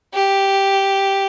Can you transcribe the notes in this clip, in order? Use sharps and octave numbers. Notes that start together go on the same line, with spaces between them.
G4